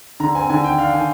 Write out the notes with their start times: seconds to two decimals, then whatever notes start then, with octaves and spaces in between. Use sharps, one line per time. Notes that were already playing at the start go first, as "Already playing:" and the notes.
0.20 D3 A#5
0.35 C4 G#5
0.49 D3 G#5
0.63 D#3 G5
0.78 D4 F5
0.92 D#3 G#5